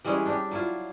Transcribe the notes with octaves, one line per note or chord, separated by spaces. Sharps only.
E3 G3 G#3 C#4
D4 G4
F#3 E4 F4